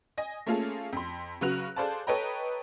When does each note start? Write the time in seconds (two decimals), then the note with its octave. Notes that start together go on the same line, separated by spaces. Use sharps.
0.18 D#5 G#5 A#6
0.46 A3 A#3 C#4 F4 G#4 A4
0.93 F2 C6
1.41 C#3 F#3 F#4 B4 F#6 F7
1.76 G#4 A4 C5 D5 F5 A5
2.07 A4 B4 C#5 D#5 G5 A#5